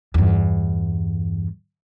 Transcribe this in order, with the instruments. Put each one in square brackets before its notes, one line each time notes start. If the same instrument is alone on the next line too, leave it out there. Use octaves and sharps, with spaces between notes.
[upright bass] E2 G2